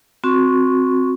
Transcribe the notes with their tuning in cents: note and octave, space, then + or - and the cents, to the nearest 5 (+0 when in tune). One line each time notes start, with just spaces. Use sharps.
C4 +0 F#4 -25 C#6 +0